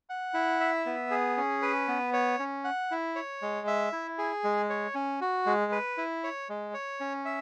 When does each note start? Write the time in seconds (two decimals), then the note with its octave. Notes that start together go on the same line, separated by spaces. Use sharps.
0.09 F#5
0.34 E4
0.61 E5
0.86 B3
1.11 G#4
1.37 C#4
1.62 B4
1.88 B3
2.13 C#5
2.39 C#4
2.64 F#5
2.91 E4
3.15 C#5
3.42 G#3
3.67 E5
3.92 E4
4.18 G#4
4.44 G#3
4.70 C#5
4.95 C#4
5.21 F#4
5.46 G#3
5.72 B4
5.98 E4
6.24 C#5
6.49 G#3
6.74 C#5
7.00 C#4
7.25 E5